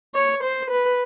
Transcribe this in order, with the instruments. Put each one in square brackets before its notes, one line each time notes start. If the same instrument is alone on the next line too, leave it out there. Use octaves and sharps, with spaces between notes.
[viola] C#5
C5
B4